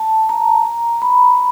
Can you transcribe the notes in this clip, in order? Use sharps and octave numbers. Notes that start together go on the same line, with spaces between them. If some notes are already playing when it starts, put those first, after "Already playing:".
Already playing: A5
A#5
B5